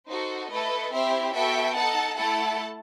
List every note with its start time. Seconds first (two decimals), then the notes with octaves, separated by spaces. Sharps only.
0.09 D#4 F#4 A4 C5
0.51 A3 E4 A4 B4 D#5
0.92 C4 E4 G4 C5 E5
1.34 B3 F#4 A4 E5 G5
1.75 D#4 A4 F#5 A5
2.17 A3 E4 A4 F#5 A5